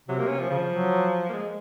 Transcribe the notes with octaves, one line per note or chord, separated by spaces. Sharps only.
C3 F#3
A#3
C#4
F3
C#3 F3
F#3
A#3
G#3